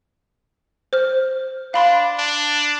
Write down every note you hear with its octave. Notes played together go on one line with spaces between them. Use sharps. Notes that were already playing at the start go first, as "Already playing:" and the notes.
C5 F6
D4 F5 B5 C6
D4